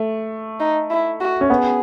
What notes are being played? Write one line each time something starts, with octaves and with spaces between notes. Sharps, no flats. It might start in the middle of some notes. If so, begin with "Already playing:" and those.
Already playing: A3
D#4
E4
F#4
C#4
B3 G#4